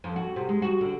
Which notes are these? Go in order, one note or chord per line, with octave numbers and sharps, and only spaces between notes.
F2
F#4
C3
G#3
F#4
D3